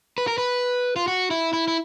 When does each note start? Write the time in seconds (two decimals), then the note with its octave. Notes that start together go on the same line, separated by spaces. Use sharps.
0.18 B4
0.28 A#4
0.38 B4
0.96 F4
1.08 F#4
1.31 E4
1.53 E4
1.68 E4